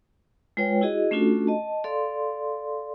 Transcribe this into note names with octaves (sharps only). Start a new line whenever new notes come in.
G#3 F4 B4 C#5 G5
E4 F#4 G#4 D#5
A3 C#4 D4 F4 F#4 A4
D#5 A5
A4 D5 F5 C6